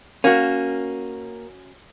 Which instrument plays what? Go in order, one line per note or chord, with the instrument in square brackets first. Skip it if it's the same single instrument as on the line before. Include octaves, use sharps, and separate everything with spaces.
[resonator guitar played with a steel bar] A#3 [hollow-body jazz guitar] C#4 F#4